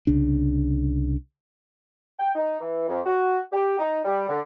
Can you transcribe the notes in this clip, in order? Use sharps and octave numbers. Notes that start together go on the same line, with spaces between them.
C2 C#3 D4
G5
D#4
E3
F2
F#4
G4
D#4
G3
D3